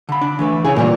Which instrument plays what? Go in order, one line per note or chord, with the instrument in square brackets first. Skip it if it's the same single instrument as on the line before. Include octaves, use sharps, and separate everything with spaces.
[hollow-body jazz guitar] D3 B5
D4
E3 A3 B4
[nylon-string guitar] C#3 E4 G#5 [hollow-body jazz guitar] G#4 C#5
[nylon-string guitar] A#2 E3 F4 [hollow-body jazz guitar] G3 A4 A#4